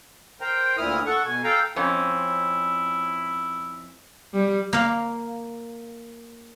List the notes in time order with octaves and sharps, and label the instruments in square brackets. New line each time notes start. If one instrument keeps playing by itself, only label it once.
[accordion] A#4 C5 G5 A#5
D2 A#2 E4 D#6 F6
A4 F#5 C#6
B2 G#5
A4 F5 G5 A#5
[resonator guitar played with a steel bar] F2 C4 C#4 [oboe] E4
[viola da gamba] G3
[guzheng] A#3 F5